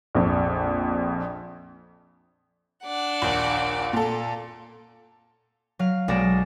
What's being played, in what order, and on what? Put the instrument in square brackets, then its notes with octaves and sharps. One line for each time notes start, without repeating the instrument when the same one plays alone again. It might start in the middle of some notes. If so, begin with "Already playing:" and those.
[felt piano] A#1 F2
[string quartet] D4 D5 F#5
[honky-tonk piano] A#1 D#2
A#2 A4
[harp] F#3 F5
B1 G#3 B3 D5 A#6 E7